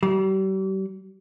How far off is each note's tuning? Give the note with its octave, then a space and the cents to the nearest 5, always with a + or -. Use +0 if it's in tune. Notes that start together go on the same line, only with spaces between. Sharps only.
G3 -40